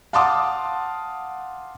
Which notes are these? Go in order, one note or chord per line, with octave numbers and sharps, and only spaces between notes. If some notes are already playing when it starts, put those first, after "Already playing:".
F5 F#5 A5 C6 D6 D#6